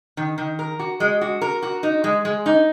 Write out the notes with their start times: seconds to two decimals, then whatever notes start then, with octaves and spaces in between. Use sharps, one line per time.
0.17 D#3
0.38 D#3
0.59 A#4
0.79 F#4
1.00 G#3
1.21 F#4
1.41 A#4
1.62 F#4
1.83 D#4
2.04 G#3
2.25 G#3
2.46 D#4